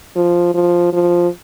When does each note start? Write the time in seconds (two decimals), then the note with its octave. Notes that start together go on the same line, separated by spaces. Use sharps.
0.16 F3
0.54 F3
0.93 F3